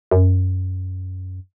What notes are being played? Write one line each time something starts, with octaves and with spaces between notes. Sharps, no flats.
F#2